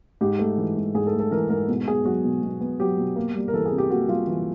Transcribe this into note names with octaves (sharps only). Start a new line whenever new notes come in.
G#2 G4
A3
E3
G#2
G#2 G#4
A4
A3
A4
E3 A#4
G#2 A#4
B2
B3 G#4
F#3 F#4
B2
B2
B3
F#3 G4
B2
A#3
G3
A#4
E3 A4
G#4
C3
G4
A#3 F#4
G3 F4
E3